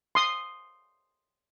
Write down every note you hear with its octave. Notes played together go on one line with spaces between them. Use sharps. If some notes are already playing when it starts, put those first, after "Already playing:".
C6 D#6